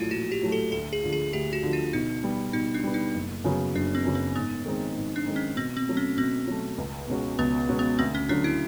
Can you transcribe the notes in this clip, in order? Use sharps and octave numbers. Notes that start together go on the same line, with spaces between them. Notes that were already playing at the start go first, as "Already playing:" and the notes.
Already playing: A#1 A2 F#3 A3 E4 F4
A#1 F#4
G4
A2 F#3 A3
A4
D2 A4
G#4
D3 F3
G#4
D2 G4
F#4
D3 F3
F4
B2 D#4
G3 B3
B2 D#4
D4
G3 B3
D#4
F#1
F#2 C#3 F#3 B3
F#1 D4
C4
F#2 C#3 F#3 B3
C4
G#2 B3
D#3 G#3 C4 D#4
G#2
D4
D#3 G#3 C4 D#4
C#4
B2 C4
C4
F#3 A3
C#4
B2 C4
F#3 A3
C#2
B2 G#3 C#4 F#4
C#2 B3
B2 G#3 C#4 F#4
B3
D2 C4
C#4
D3 F#3 D4
E4